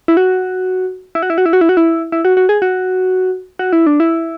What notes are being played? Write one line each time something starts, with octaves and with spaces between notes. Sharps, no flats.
E4
F#4
E4
F#4
E4
F#4
E4
F#4
E4
F#4
E4
E4
F#4
F#4
G#4
F#4
F#4
E4
D4
E4